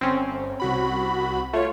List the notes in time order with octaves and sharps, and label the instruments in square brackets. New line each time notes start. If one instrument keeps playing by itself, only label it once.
[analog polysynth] G1 [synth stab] C4 C#4
[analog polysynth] C2 F#4 B5
[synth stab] A3 [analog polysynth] F4 C#5